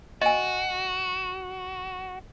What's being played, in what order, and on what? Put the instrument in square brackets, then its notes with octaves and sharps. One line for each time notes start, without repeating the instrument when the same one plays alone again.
[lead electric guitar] F#4 [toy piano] D#5 G#5